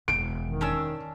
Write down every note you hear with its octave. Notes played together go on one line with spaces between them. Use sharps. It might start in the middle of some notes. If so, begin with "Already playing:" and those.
E1 F#2 D7
D#3
C#4 D4 E6